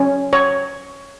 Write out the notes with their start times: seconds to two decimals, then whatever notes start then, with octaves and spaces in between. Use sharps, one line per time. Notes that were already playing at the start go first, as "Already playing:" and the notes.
Already playing: C#4
0.33 C#5